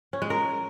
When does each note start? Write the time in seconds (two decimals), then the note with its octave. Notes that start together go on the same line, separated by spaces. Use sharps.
0.13 C#4
0.22 G#3
0.30 A#4